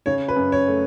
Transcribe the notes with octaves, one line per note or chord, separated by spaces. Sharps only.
C#3 C#5
B4
F#2
C#5
A3